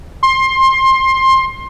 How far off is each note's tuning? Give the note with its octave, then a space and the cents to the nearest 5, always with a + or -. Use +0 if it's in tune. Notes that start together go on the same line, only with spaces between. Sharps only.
C6 +20